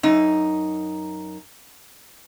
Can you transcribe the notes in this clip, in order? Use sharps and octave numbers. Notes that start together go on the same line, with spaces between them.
F#2 D#4